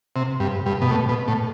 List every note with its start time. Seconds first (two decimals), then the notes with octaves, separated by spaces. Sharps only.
0.16 C3
0.40 G2
0.66 G2
0.81 B2
0.91 A2
1.09 B2
1.28 A2